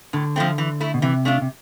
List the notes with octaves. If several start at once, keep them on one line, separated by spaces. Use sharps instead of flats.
A2 D3
F3 A3 C4
E3
A3 E4
B2
C3 E3
A3 D4 F4
C3